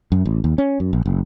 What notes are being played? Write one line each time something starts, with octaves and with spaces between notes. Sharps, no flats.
F#2
A1
D#2
C#4
F#2
A#1
F#1